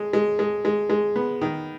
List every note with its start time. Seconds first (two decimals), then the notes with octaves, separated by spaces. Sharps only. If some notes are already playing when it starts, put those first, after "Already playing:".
Already playing: G#3
0.13 G#3
0.39 G#3
0.65 G#3
0.90 G#3
1.16 B3
1.41 D#3